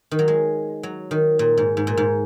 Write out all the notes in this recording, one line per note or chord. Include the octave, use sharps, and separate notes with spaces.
D#3
F#3
G#3
F#3
D#3
A#2
G#2
G#2
A#2
G#2